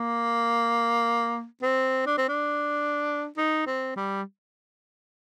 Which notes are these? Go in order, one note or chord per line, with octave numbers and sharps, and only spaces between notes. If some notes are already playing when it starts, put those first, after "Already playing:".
Already playing: A#3
C4
D4
C4
D4
D#4
C4
G3